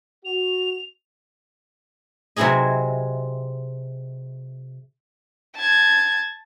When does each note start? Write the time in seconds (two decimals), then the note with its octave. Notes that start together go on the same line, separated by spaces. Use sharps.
0.25 F#4 F7
2.36 C3 F#3 C4 E4 G#4 D#5
5.56 A5 G#6